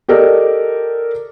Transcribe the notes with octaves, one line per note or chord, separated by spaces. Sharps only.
G4 A4 A#4 D5 D#5